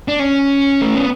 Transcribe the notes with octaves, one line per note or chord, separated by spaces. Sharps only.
D4
C#4
A3
B3